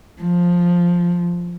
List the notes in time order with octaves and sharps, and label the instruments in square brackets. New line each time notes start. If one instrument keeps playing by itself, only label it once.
[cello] F3